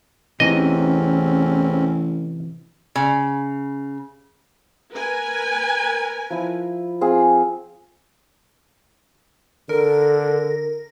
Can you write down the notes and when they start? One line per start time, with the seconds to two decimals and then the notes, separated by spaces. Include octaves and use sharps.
0.40 A1 E2 C3 E3 C4 C#4 D#4 D#5
2.96 C#3
4.93 A#4 B4 G#5
6.30 F3 E4
7.01 C4 F4 G#4
9.69 D3 A4 A#4